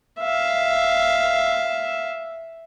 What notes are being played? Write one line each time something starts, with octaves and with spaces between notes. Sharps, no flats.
E5 F5